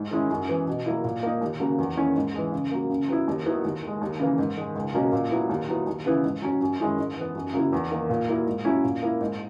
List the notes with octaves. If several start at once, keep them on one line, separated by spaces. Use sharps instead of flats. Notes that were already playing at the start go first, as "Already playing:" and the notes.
Already playing: G#2
D#3 G#3 C#4 E4
F#2
E3 B3
B2
F#3 A#3 E4
A#2
A#3 D#4
D#2
C#3 F#3 A#3
E2
D#3 A#3 C#4 E4
G#2
E3 G#3
C#3
F#3 A#3
C#3
F#3 B3 E4
D#2
D#3 F#3 B3 E4
D#2
D#3 G#3
D#2
C#3 E3 A#3
G#2
D#3 G#3
C#2
B2 F#3 A#3 C#4
A#2
F#3 B3 E4
D#2
D#3 F#3 B3 E4
D#2
C#3 E3 B3 E4
G#2
F#3 C#4
F#2
D#3 G#3 C#4 E4
G#2
E3 B3
F#2
C#3 F#3 A#3 E4
E2
D#3 A#3
A#2
F#3 A#3 E4
G#2
F#3 C#4 E4
A#2
A#3 E4
G#2